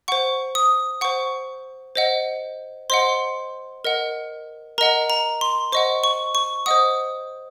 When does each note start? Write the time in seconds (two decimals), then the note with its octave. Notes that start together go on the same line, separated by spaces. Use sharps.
0.08 C5 F#5 C#6
0.55 D#6
1.01 C5 F#5 C#6
1.95 C5 D#5 F#5
2.90 C5 D#5 F#5 C6
3.85 A#4 D#5 F#5
4.78 A#4 D#5 F#5 A#5
5.10 A#5
5.41 C6
5.72 C5 D#5 F#5 C#6
6.04 C#6
6.35 C#6
6.66 C5 D#5 F#5 D#6